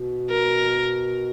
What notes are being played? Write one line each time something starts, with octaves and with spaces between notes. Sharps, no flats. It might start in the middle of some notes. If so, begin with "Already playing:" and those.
Already playing: B2
A#4